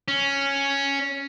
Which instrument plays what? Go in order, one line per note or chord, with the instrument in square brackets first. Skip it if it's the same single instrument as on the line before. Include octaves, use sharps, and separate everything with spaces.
[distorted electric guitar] C#4